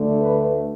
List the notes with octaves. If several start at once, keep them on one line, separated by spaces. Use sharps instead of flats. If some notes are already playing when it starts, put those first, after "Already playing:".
Already playing: D2 D3 A3
B4